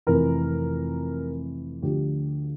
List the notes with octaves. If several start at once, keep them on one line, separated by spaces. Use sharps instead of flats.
F1 F2 E3 A#4
D2 D3 F3 G4